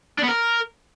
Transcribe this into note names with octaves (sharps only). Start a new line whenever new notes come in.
D4
B3
A#4